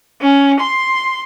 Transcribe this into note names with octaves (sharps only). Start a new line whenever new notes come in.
C#4
C6